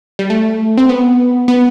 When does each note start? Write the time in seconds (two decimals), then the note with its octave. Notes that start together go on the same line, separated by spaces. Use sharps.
0.19 G3
0.30 A3
0.78 C4
0.89 B3
1.48 B3